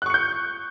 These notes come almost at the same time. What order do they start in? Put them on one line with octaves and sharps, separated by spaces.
F#6 C#6 C#7 G6